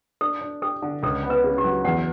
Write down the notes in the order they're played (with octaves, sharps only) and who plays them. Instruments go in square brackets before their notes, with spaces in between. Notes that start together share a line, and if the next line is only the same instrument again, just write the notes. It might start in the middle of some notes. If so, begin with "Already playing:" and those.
[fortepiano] D4 [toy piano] A4
[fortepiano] D4
[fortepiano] G4 [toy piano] A4
[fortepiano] D3
[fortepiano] C#2 [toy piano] A4
[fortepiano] B3
[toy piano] B4
[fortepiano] C#3
[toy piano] G4
[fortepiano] F#3
[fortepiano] E2 [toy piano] F#5